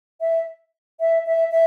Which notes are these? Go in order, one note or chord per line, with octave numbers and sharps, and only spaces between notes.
E5
E5
E5
E5